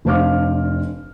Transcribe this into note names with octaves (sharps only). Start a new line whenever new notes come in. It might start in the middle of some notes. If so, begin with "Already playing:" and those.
F1 D4 C5 F5 D6 F6